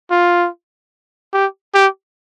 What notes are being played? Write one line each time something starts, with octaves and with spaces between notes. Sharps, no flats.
F4
G4
G4